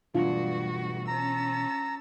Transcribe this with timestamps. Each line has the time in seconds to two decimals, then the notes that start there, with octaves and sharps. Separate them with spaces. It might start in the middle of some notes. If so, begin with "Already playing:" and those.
0.14 D2 G2 B2 E3 F#3 D4 F4 F#4
1.08 C#4 A5 A#5 E6